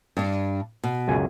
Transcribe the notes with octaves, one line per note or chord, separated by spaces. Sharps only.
G2 D4
B2
C#2 F#2 G#5